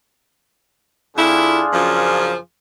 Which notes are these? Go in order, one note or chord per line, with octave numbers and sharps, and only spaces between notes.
F2 D4 E4 F4 G#4
F#2 C#3 F3